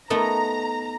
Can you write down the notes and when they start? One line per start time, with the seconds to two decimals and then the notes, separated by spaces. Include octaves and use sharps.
0.10 A3 B3 D#4 A#5